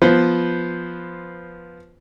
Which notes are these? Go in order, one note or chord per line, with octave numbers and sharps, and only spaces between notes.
F3 B3 B4 C5